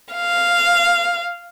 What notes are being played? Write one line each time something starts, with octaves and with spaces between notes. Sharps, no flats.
F5